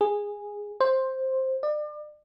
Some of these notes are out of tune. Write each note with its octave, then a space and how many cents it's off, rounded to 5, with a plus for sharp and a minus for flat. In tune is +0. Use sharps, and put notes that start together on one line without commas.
G#4 -10
C5 +10
D5 +35